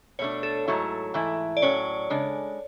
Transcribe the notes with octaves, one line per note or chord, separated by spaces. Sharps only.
B2 A3 D4 C#5
A4
G#2 F#3 A3 E4
G#2 E3 A3 E4
D5
A2 F#3 C#4 C#5
C#3 G#3 D4